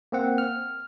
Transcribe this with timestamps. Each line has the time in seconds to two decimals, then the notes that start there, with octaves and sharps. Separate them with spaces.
0.12 A#3 C4 F#5
0.38 F6